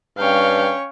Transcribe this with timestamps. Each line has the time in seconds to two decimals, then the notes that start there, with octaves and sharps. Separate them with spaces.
0.18 G2 C#4 C#5 F5 G5